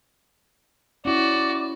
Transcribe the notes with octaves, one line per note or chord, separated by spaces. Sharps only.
C#4 E4 F#4 D5